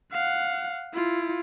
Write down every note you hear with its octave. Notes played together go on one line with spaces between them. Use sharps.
F5 F#5
E4 F4